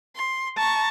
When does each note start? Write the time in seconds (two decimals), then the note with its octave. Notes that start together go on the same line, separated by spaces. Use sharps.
0.15 C6
0.57 A5 A#5 C#6